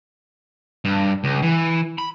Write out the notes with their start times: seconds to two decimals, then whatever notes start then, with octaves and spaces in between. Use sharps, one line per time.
0.85 G2
1.24 C#2
1.42 E3
1.98 B5